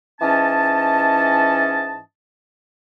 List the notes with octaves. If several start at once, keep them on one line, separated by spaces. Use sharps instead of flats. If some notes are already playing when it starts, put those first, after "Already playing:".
G#2 E3 C#4 D#5 A5